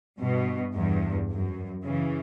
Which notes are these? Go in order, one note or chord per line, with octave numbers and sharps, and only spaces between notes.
G2 B2
E2 G2
F#2
C#3 E3